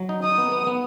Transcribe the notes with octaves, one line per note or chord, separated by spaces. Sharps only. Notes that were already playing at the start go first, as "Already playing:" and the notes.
Already playing: F#3
D#4
D#4 D#6
B3
B3
B3